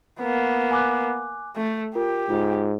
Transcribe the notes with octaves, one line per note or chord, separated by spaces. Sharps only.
A#3 B3
G#5 D6 F#6
A3
F4 G4 A#4
G#2 F4